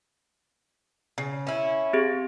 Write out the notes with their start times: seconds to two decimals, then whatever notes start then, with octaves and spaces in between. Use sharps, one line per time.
1.18 C#3
1.47 C#4 E4
1.93 C4 G4 G#4